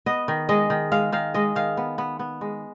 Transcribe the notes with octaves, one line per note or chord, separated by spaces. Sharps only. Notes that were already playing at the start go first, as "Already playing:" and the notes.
B3 D#5
D#3
G#3 D#5
D#3
G#3 F5
D#3 F5
G#3 D#5
D#3 F5
B3
B3
B3
G#3